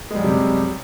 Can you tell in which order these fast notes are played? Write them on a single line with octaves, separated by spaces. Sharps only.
G#3 G3 F#2 C3